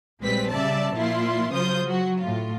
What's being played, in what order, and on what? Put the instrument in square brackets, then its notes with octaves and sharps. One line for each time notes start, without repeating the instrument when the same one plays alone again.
[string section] A#1 G3 G#3 C4 B4 B6
C#3 G3 D5 E5 A5
A#2 F3 E4 F4 C6
C#3 F#3 F4 C5 D#6 G6
F#3 F#4
A2 F4